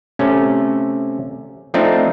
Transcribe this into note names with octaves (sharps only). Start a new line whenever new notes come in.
C3 A3 C#4
F3 A3 C4 D4 D#4